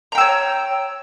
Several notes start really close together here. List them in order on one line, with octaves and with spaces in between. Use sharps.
A#5 G5 E6 C#5